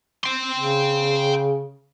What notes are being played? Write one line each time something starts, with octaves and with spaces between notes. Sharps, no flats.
G5 C6
C#3